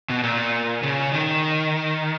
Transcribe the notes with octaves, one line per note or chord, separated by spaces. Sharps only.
B2
A#2
C#3
D#3